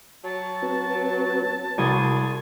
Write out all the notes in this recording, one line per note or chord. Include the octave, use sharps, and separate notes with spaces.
F#3 A5
C4 F#4 B4
C2 F#4 G#4 C6